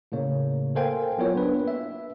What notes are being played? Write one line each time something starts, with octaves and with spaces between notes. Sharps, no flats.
A2 C#3 A#3 C#5
A4 A#4 C5 F5 G5 G#5
F#3 B3 E4 F4 A#4 C#5
A#3 B3 D4 B4
E5